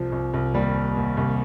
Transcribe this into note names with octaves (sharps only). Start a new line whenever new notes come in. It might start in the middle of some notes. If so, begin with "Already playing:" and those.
Already playing: C2 F3
C2
C2
D#2 G3
D#2
D#2
C2